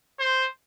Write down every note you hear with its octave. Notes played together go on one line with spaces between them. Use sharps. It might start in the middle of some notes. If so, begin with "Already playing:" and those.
C5